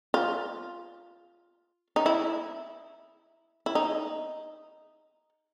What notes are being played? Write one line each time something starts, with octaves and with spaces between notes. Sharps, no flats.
F4
D#4
E4
E4
D#4